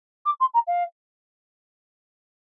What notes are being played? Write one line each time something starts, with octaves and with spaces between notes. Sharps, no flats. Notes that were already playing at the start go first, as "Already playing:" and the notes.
D6
C6
A#5
F5